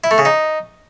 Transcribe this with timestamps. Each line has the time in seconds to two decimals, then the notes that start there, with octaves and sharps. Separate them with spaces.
0.04 E4
0.11 A3
0.18 C#3
0.25 D#4